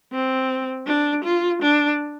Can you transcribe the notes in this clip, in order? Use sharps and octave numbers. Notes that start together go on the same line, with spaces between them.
C4
D4
F4
D4